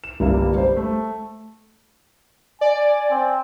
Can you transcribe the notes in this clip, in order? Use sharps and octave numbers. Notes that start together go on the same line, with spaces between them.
E7
G1 C2 G3 A#3
G3 C5
A3
D5 G#5
C4